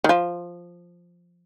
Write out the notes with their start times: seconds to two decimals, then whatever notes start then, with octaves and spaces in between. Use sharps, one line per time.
0.04 D#3
0.09 F3